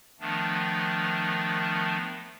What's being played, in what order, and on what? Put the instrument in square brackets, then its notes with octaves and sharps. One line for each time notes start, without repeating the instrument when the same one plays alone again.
[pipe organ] D#3 F3 A3 B3 D4